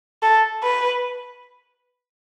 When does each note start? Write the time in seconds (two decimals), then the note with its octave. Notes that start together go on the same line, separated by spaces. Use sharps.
0.23 A4
0.63 B4